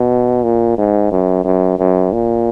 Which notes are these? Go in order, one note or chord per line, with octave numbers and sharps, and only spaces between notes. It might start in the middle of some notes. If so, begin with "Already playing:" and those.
Already playing: B2
A#2
G#2
F#2
F#2
F#2
A#2